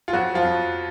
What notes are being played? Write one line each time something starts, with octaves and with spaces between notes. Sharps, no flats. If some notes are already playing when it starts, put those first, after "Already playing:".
F4
F2 F#3 F#4
F3 F4
F2